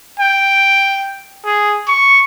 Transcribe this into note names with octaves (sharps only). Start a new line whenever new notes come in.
G5
G#4
C#6